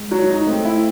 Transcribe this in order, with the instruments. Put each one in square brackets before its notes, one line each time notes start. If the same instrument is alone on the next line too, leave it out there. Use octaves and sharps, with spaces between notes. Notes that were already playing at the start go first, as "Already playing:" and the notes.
Already playing: [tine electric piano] G#3
[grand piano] F#3
D#4
[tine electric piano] A3 [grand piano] C4
[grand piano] E4